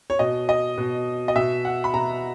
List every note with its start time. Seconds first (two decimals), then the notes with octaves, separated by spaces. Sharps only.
0.10 C#5
0.19 B2 D#5
0.49 D#5
0.78 B2
1.28 D#5
1.36 B2 E5
1.65 F#5
1.84 B5
1.94 B2 A#5